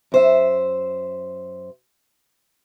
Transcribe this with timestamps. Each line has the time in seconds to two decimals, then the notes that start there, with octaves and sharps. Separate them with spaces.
0.12 F#2 C5 E5